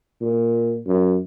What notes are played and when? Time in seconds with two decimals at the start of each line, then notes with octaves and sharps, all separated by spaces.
0.22 A#2
0.87 F#2